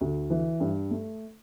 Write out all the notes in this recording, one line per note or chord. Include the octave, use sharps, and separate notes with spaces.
D2
E3
G2
A3